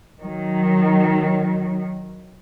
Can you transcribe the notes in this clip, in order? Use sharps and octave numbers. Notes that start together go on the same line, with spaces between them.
D#3 F#3